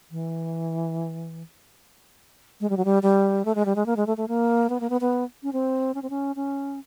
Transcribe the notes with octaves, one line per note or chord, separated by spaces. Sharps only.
E3
G#3
G3
F#3
G3
G3
A3
G#3
G3
G#3
A#3
G#3
A3
A3
A#3
B3
A#3
B3
B3
C#4
C4
C#4
C4
C#4
C#4